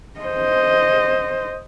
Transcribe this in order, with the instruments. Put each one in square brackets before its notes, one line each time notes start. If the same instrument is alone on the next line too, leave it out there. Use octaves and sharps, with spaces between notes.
[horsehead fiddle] C5 D#5